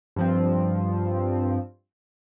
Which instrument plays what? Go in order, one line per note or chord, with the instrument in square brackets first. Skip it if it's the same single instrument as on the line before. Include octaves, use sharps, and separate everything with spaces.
[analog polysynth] G2 F3 C4